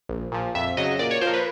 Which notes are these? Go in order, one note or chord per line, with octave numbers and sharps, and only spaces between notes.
A#1
A#2 F3
F2 E5
C#3 F#3 D#5
A#2 D5
C#5
F3 C5
A#3
B4